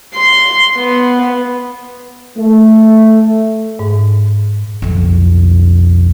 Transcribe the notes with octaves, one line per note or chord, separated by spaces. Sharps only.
C6
B3
A3
G#2
B1 F2